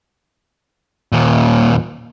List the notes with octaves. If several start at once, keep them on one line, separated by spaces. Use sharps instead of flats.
D#2 A#2